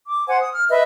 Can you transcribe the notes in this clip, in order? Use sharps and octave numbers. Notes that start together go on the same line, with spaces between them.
D6
C5 F#5 G#5
D#6
F6
B4 D#5 E5